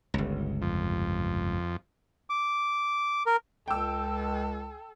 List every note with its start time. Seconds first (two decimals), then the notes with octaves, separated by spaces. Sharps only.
0.14 G1 C#2
0.62 F2
2.30 D6
3.26 A#4
3.68 C#2 A4 G5 E6